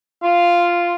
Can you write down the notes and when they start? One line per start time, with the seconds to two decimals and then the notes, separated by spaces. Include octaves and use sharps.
0.22 F4 F5